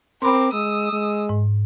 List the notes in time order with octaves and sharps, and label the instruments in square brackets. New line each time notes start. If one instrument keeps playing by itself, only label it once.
[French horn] C4 [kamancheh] A#4 D6 [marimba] B5 C6
[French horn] G#3 [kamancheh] D#6 E6
[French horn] G#3
[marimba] G#2